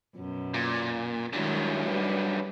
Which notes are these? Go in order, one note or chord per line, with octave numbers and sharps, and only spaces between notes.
F#2 B2
A#2
G2 D#3 F#3 G#3 E4
G3 D#4 B4